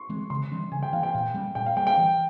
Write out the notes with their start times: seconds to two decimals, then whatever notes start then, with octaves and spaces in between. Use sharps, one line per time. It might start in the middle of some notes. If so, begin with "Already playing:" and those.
Already playing: C6 C#6
0.09 E3 G#3 C4
0.30 C#3 C6
0.52 E3 G3 C#4
0.71 C#3 G#5
0.83 G5
0.93 E3 F5
0.96 A#3
1.03 G5
1.14 A#2
1.34 G3 A#3 C#4
1.55 A#2 G5
1.66 F5
1.76 G3 A#3 G5
1.87 G5
1.98 E3